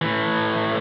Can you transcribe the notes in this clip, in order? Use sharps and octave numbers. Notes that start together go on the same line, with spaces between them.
A2 E3